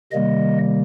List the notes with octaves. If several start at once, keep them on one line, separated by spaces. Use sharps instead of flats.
C3 D#3 G3 A#3 D#5